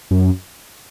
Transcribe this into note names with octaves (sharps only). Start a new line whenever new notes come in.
F#2